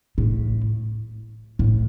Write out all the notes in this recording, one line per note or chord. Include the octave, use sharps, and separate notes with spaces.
A2
A2